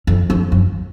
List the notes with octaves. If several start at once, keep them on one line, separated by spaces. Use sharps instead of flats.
F2
F2
F#2